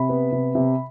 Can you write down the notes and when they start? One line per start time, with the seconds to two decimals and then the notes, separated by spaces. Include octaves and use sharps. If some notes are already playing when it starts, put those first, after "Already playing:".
Already playing: C3 B5
0.09 B3
0.32 C3
0.55 C3